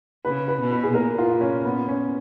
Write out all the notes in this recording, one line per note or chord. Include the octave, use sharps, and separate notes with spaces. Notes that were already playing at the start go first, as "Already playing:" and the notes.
C#3 B4
B4
B2
B4
G#4
A#2 A#4
F4
C#4
B3
C#4